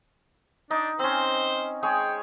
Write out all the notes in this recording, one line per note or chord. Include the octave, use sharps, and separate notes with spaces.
D4 D#4
C4 C#4 C5
G#3 G#4 C#5 G5